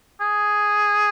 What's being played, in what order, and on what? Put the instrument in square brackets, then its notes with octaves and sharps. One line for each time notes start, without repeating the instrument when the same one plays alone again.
[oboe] G#4